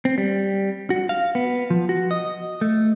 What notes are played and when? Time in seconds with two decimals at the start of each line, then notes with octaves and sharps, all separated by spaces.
0.05 C4
0.18 G3
0.90 F#4
1.09 F5
1.35 B3
1.70 F3
1.89 F#4
2.11 D#5
2.61 A3